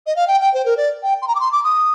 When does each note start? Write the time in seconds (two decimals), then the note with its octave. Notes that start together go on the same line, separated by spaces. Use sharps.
0.06 D#5
0.16 F5
0.28 G5
0.41 G5
0.53 C5
0.65 A#4
0.77 D5
1.03 G5
1.22 C6
1.28 A#5
1.35 D6
1.40 C6
1.52 D6
1.64 D#6